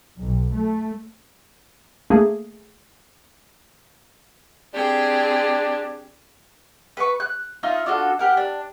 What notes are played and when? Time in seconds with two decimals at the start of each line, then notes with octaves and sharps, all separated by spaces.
0.18 B1
0.54 A3
2.10 A3 A#3 G#4
4.74 C4 D4 G4 G#4
6.97 B4 C#6
7.20 F#6
7.63 D#4 F4 D#5 E5
7.86 D4 F4 F#4 A4
8.19 G4 A#4 F#5
8.37 D4